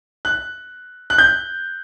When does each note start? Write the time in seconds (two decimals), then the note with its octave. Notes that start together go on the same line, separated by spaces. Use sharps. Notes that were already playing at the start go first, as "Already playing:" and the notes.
0.25 F#6
1.10 F#6
1.18 G6